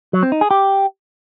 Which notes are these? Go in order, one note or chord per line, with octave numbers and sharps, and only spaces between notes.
F#3
C4
D#4
G#4
G4